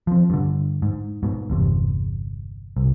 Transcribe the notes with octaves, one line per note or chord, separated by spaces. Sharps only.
F3 C4
G2 D3
G#2
G#2 B2
G1 E2 C3
C2